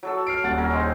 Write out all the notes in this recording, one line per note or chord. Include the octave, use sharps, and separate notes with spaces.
F#3 A4 E6
F6 C7 D7
D#1 F#5 A6
C#4 A#4
G#3 C4 D#4